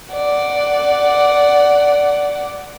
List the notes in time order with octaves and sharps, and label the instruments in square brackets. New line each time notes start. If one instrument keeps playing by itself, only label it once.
[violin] D5 F#5